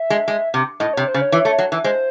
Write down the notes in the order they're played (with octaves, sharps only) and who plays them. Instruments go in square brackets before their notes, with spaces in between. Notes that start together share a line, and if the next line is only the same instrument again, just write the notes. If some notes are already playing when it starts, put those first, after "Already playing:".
Already playing: [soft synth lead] E5
[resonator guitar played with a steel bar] G#3
G#3
C3
[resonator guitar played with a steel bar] A2 [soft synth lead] D#5
[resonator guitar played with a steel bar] C3 [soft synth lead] C#5
[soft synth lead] C5
[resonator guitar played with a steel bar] C#3
[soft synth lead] C#5
[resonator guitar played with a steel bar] E3
A3
F#3
E3
[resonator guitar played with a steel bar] G#3 [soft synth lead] C5